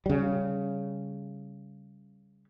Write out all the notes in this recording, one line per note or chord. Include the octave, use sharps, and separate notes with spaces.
C#3 G3